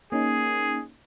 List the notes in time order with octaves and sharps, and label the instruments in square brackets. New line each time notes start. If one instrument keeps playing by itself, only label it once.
[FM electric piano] A#3 C#4 D#4 [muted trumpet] G#4